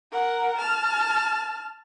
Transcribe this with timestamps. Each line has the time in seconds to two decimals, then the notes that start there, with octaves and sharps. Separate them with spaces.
0.12 A#4 F#5
0.58 A5 F6